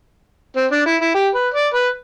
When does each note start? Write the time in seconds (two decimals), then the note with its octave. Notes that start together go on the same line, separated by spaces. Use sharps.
0.56 C4
0.71 D4
0.86 E4
1.01 E4
1.15 G4
1.35 B4
1.54 D5
1.74 B4